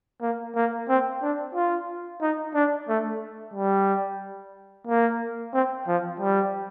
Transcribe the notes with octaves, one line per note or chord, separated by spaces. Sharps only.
A#3
A#3
C4
D4
F4
D#4
D4
A3
G3
A#3
C4
F3
G3